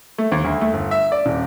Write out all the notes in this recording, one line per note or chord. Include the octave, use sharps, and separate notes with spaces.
A3
D#2
D2
A3
G1
E5
D5
D#1